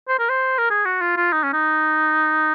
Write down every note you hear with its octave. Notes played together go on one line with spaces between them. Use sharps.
C5
A#4
C5
A#4
G#4
F#4
F4
F4
D#4
C#4
D#4